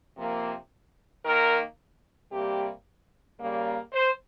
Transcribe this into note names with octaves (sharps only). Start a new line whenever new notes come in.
C3 F3 A#3
D#3 A#3 A#4
C3 G3 A#3 G4
C#3 G3 A#3
C5